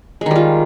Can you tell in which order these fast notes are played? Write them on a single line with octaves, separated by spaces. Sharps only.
G#3 D#3 G3 F4